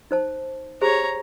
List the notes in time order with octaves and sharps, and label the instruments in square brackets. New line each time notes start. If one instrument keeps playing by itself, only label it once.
[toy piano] D#4 C5 A5
[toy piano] G4 G#4 C5 [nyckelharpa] C#5 A#5